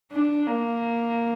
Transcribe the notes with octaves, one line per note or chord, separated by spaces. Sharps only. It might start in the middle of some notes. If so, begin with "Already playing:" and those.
D4
A#3